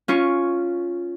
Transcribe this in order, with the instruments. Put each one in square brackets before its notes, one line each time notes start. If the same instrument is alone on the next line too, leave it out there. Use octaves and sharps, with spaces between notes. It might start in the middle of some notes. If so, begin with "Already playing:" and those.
[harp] C#4 F4 C#6